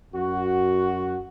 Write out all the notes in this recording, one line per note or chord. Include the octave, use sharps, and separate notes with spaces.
F#2 F#4